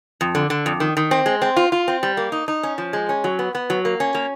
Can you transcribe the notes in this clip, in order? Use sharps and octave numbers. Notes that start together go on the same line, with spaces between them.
F2
D3
D3
F2
D#3
D#3
C4
G#3
C4
F4
F4
C4
G3
A#3
D#4
D#4
C#4
F3
G#3
C#4
F#3
B3
B3
F#3
A#3
C#4
A#3